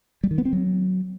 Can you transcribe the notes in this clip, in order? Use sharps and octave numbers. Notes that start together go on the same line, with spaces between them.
G3
D#3
B3
C4
F#3